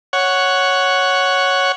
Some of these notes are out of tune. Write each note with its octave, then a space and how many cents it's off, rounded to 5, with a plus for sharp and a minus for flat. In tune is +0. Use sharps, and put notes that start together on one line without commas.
C#5 +0 F#5 +0